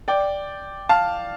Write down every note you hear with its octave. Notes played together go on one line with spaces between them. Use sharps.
D5 G5
F5 A5